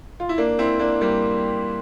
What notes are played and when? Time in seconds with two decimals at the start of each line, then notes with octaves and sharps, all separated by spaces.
0.20 F4
0.29 E4
0.38 A#3 D4
0.59 C4 E4
0.79 A#3 D4
1.01 G3 A#3